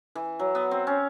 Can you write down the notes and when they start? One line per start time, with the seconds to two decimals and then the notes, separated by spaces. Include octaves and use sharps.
0.15 E3
0.39 F#3
0.55 B3
0.71 C4
0.87 C#4